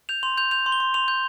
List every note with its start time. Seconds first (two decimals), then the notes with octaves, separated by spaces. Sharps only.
0.09 G6 F7
0.23 C6 F7
0.37 G6 F7
0.51 G6 F7
0.66 C6
0.72 G7
0.80 C6
0.94 C6 F7
1.08 G6